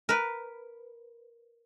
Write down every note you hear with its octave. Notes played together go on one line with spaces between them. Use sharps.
A#4 B4